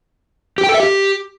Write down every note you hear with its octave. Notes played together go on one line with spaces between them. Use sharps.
G4
G5
A4
E5
G4